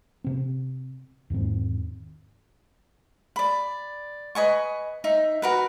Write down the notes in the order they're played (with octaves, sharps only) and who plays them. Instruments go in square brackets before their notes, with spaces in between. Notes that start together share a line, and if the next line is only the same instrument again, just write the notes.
[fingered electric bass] C3 C4
E2 G#2 D#3 C4
[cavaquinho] D5 B5
B4 D#5 G#5 C#6
D#4 E5
F#4 A#4 B4